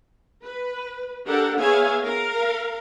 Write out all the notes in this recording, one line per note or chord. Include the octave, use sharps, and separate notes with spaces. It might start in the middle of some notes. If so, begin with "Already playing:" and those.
B4
D4 G4 A4 A#4 F#5
B3 G#4 C#5 E5 F5 G#5
A#4 F5